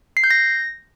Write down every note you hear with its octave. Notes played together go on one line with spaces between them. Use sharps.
C7
G6
A#6